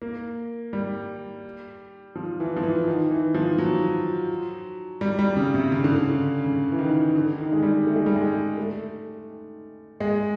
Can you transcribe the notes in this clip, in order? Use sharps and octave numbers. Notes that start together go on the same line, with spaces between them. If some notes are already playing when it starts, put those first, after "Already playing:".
A#3
G3
F3
E3
F3
E3
D#3
E3
F3
F#3
G3
G3
C#3
C3
C#3
D3
C#3
C#3
E3
D#3
D3
D#3
G#3
G3
A3
G#3
G3
G#3
A3
G#3